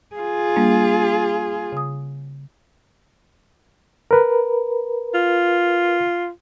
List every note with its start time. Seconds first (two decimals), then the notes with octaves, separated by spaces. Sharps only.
0.16 F4 G#4
0.56 G3 A#3 D4
1.72 C#3 D#6
4.11 A#4 B4
5.14 F4